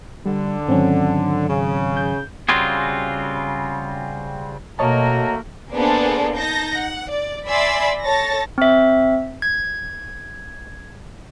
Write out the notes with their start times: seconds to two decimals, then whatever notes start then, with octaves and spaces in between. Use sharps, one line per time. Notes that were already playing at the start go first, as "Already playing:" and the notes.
0.26 D3 G3
0.68 G#2 D#3 F#3 C4 C#4
1.48 C#3
1.97 G6
2.49 C#3 G3 C4 F4 F#4 G#4
4.79 B2 A3 A#3 F#4 C#5 D#5 A5 A#5
5.73 A#3 B3 D4 G#4 A4 C5
6.36 D#4 A5 G6 A#6
6.76 F#5
7.09 D5
7.47 D5 E5 G#5 B5 C6 E6
8.05 A4 C#5 A5 A6 A#6
8.58 C4 E5
9.42 G#6